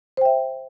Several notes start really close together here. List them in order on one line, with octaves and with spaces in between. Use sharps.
C5 G5 E5